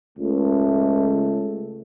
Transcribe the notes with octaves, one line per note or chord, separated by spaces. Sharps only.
C#2 A3